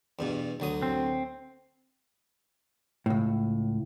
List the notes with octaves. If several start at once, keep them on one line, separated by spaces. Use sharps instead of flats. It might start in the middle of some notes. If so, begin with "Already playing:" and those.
E2 G2 B2
D2 F#3 D#6
C4
C#2 A2